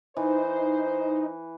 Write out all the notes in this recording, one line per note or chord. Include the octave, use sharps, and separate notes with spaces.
E3 D#4 C5